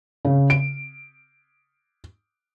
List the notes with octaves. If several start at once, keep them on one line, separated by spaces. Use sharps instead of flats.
C#3
D7